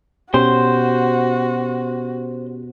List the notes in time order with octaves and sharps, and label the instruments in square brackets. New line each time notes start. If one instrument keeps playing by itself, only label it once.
[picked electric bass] B2 [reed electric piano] C#4 G4 [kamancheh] F#4 [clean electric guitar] C5